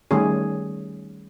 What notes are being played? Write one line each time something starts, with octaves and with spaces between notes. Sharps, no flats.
D#3 G3 A3 C#4 G#4